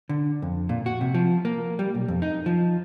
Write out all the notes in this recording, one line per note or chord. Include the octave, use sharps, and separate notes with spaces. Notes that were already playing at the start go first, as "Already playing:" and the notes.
D3
F2
A#2
F#4
C3
F3
A#3
G3
B1
F2
D#4
F3